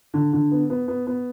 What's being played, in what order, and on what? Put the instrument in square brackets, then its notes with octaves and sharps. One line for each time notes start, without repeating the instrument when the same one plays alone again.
[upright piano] D3
D3
B3
B3
B3
B3